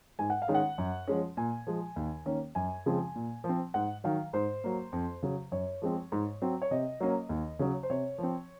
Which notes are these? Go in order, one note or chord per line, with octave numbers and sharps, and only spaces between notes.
G#2 G#5
F#5
F5
D#3 G#3 C#4
F#5
F#2
F3 G#3 C#4
A#2 G#5
F3 G#3
D#2
D#3 A#3 C#4
F#2 G#5
C#3 F3 G#3 C4
A#2
F3
C4
G#2 F#5
D#3 F#3 F5
G#2 C5
F#3 A#3
F2
C#3 F#3
F#2 C#5
F3 G#3 C4
G#2
F#3 C4
C#5
C3 D#5
F#3 A#3 C#4
D#2
C#3 F#3 C#4
C5
C3 C#5
F3 C4